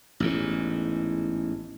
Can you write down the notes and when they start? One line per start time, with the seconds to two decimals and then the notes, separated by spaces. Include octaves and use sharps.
0.20 A1 E2 G#2